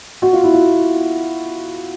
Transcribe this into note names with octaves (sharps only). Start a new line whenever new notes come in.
F#4
F4
E4
F4